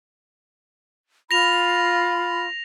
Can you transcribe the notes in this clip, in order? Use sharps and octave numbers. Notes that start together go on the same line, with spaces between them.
F4 B5 A#6 F7